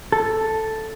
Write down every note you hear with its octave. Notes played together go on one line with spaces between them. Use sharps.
A4